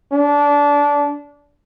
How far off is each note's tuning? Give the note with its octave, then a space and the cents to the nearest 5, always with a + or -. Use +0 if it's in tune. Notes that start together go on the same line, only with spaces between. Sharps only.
D4 -20